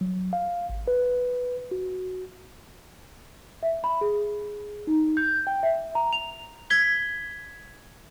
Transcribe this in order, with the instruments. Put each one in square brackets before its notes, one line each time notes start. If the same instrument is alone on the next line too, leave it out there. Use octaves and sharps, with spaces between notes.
[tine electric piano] F#3
F5
G#1
B4
F#4
[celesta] E5
B5
G#4
D#4
G6
G5
E5
A#5
F7
G#6 B6 G7